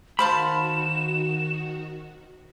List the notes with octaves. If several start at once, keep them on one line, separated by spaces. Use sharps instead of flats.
D#3 F#4 C5 F5 A5 B5 E7